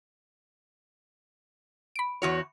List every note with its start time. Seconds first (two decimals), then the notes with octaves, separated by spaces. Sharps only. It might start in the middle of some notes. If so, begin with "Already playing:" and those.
1.96 B5 D7
2.22 E2 F#4 C#5